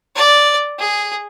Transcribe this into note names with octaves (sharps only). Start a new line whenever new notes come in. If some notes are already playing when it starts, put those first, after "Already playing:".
D5
G#4